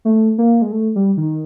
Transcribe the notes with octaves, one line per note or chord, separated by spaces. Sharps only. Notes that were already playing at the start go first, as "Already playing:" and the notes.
A3
A#3
G#3
A3
G3
D#3